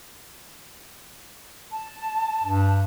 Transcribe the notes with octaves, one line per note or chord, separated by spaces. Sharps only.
A5
G2